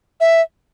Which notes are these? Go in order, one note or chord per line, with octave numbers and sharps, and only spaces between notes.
E5